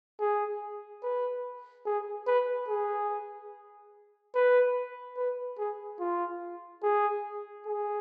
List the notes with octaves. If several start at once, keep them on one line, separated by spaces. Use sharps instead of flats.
G#4
B4
G#4
B4
G#4
B4
B4
G#4
F4
G#4
G#4